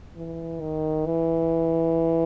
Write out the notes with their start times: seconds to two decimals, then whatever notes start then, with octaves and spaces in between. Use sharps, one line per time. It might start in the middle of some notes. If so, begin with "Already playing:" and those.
0.17 E3
0.61 D#3
1.06 E3